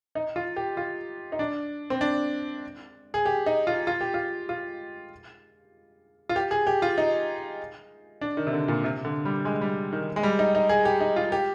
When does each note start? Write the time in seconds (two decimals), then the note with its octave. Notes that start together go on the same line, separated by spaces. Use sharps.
0.15 D#4
0.36 F4
0.56 G4
0.77 F4
1.32 D#4
1.39 D4
1.90 C4
2.01 D4
3.14 G#4
3.26 G4
3.46 D#4
3.67 F4
3.87 F4
4.01 G4
4.14 F4
4.49 F4
6.29 F4
6.36 G4
6.51 G#4
6.67 G4
6.82 F4
6.98 D#4
8.21 D4
8.37 D#3
8.47 C3
8.53 D3
8.68 A#2
8.84 C3
9.05 D3
9.25 G3
9.45 G#3
9.61 G3
9.93 D#3
10.16 G#3
10.23 G3
10.39 D#4
10.55 D#4
10.69 G#4
10.85 G4
11.01 D#4
11.16 F4
11.32 G4